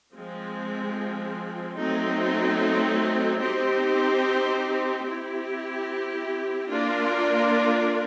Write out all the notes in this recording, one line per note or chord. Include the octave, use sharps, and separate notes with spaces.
F3 G#3 C4
F#3 A3 C4 D#4
C4 D#4 G4 C5
C4 E4 G4
A#3 D4 F4 A#4 D5